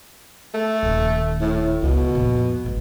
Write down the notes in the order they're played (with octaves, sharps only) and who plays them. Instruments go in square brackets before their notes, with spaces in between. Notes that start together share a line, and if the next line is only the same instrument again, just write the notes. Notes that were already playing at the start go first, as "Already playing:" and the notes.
[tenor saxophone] A3
[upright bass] D#1 D#3
[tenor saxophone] A2
[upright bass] C#2 [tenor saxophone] B2
[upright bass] F2 A#2
G#1 A2